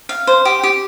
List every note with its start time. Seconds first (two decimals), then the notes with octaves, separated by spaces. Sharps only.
0.09 F5
0.27 C5
0.45 G4
0.63 G4